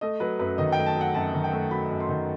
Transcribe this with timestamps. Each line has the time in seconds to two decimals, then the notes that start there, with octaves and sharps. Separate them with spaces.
0.01 A3 D#5
0.20 F#3 B4
0.39 F#2 B4
0.58 D#3 D#5
0.72 G5
0.78 A3
0.86 A5
0.96 F#3
1.01 F#5
1.14 F#2 A5
1.34 D#3
1.44 G5
1.52 A3
1.71 F#3 B5
1.90 F#2
2.00 C6
2.09 D#3